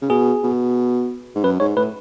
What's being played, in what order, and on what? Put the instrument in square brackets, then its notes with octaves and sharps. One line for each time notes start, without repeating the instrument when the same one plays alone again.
[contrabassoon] C#3
[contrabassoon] B2 [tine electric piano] G#4
[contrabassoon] B2
G#2
[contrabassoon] F#2 [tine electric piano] B4
[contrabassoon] G#2 [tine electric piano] C#5
[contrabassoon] A2 [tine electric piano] B4